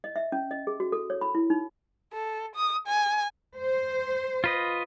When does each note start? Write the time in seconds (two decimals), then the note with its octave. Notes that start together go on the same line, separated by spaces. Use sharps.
0.04 D#5
0.16 E5
0.32 C#4
0.51 D#5
0.67 G#4
0.80 F#4
0.92 A4
1.10 C#5
1.21 B5
1.35 E4
1.50 D#4
2.14 A4
2.56 D#6
2.88 G#5
3.56 C5
4.44 F4 B4 D#5